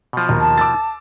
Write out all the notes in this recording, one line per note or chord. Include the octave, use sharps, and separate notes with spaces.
B2 F3
D#2 A#5
A5
D6 E6 A6